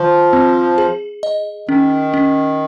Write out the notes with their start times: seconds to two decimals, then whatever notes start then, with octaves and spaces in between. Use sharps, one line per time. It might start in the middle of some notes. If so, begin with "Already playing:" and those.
Already playing: D#3 F3
0.33 C4
0.78 G#4
1.23 D#5
1.69 D#3 C#4
2.14 C#4